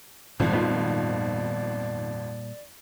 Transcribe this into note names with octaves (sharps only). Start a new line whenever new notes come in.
G#1 F2 A#2 G3 D5
B3 D#4 F4